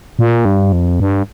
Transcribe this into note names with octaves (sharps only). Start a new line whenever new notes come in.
A#2
G2
F2
G2